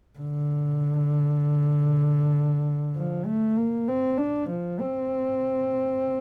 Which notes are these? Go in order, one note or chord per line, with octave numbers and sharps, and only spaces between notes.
D3
F3
A3
A#3
C4
D4
F3
C4